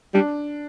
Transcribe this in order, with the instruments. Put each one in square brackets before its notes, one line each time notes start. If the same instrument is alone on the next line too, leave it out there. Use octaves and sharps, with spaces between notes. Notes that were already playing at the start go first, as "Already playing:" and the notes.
[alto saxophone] G3 [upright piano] D4